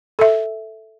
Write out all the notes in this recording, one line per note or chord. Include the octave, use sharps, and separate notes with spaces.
A4 E5